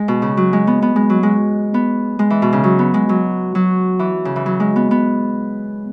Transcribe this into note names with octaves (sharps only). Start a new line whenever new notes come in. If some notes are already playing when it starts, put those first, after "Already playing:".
Already playing: G#3
B2
C#3
F#3
G#3
B3
B3
G#3
F#3
G#3
B3
G#3
E3
B2
C#3
F#3
B3
G#3
F#3
F#3
E3
C#3
E3
F#3
G#3
B3
B3